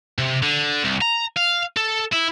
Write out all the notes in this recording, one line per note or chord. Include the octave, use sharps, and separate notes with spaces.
C3
D3
C2
A#5
F5
A4
E4